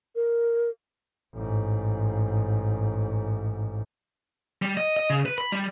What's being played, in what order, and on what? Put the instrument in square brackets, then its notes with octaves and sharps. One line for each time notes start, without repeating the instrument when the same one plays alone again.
[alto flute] A#4
[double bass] A1 G#2
[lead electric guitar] G3
D#5
D#5
C#3
B4
B5
G3